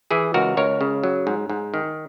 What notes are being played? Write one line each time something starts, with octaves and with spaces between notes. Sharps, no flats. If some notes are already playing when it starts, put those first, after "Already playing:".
E3 E4 G#4
C#2 F#4 A#4
C#2 A#4 C#5
C#3
F#3
G#2
G#2
D#3